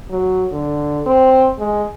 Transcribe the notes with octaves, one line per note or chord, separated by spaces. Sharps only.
F#3
D3
C4
G#3